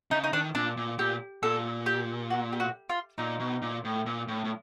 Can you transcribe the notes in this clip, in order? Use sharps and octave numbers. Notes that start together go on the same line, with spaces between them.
C#3 D#4
D#4
D#3 D4
A#2 D4
A#2
A#2 G4
A#2 A4
G4
F#4
G4
F#4
F4
A#2 D#4
B2
A#2
A2
A#2
A2
A2